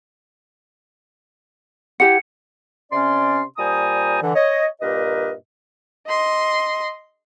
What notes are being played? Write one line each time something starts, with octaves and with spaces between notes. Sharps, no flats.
E4 G4 F#5 C#7
C3 C#4 D5 C6
A#2 G3 C5 G#5 A#5 D#6
D3 E3
C#5 D#5
G2 A#2 G4 A#4 B4 D#5
D#5 C6